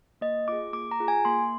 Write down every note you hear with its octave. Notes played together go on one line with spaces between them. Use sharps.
A#3 D#5
F4 G#4 D6
A#3 D6
A#5
F4 G#4
G#5
A#3 C6